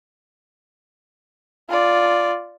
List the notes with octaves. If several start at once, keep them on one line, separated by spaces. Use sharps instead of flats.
F4 D5